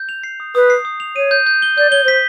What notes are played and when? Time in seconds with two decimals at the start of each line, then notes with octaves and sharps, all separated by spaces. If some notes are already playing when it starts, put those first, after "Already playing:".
Already playing: G6
0.09 F7
0.23 C7
0.40 D#6
0.55 B4 D#6
0.70 C7
0.85 D#6
1.00 F7
1.16 C#5 D#7
1.31 G6
1.47 G6
1.62 G7
1.78 D5 G6
1.90 C#5 G7
2.04 C5 B6